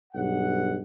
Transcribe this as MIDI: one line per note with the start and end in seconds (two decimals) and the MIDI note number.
0.14 0.78 35
0.14 0.78 43
0.14 0.78 78